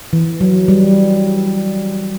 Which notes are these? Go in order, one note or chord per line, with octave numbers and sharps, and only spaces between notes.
E3
F#3
G3